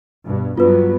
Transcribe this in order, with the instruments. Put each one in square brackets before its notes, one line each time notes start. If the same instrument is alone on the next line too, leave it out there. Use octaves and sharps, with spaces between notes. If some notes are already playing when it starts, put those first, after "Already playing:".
[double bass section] G2 B2
[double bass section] G2 F#3 B3 [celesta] F4 B4